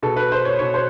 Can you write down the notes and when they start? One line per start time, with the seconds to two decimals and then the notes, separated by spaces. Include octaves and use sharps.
0.03 B2 A4
0.17 B4
0.32 C5
0.45 C#5
0.59 B2 C#5
0.74 C5